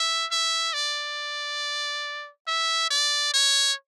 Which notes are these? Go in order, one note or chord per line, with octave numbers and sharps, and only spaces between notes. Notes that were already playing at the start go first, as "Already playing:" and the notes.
Already playing: E5
E5
D5
E5
D5
C#5